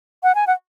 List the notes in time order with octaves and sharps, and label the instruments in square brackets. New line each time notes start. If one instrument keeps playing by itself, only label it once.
[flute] F#5
G#5
F#5